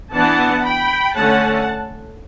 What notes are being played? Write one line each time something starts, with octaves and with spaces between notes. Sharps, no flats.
E3 B3 D4 F#5 A5
G5 B5
D3 A3 C#4 F#5 A5